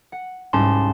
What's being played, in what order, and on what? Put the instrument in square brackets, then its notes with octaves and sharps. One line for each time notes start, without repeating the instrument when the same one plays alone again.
[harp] F#5
[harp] C2 G#2 [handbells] C#4 A5 C6